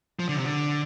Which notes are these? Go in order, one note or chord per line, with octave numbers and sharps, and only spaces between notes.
F3
D3
C3
D3